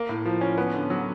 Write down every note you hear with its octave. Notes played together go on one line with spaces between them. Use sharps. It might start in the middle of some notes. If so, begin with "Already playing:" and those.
Already playing: A#3
A2
F3
C#4
B3
D3
F#3